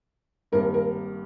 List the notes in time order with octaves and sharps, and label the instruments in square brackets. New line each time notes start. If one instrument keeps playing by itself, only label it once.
[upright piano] G#1 G2 D#3 A#3 A#4
A#4